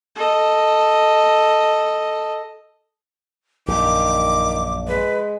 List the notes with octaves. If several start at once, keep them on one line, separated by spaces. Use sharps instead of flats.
A4 D#5
A#1 F#2 D#3 D6
G#3 B4